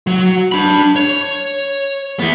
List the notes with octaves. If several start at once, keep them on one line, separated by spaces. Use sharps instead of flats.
F#3
D4 B5
C#5
E2 B3